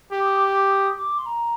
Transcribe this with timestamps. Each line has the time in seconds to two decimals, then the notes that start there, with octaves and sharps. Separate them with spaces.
0.12 G4 D6
0.25 D#6
0.37 D6
0.70 D#6
0.98 D6
1.18 C6
1.26 A#5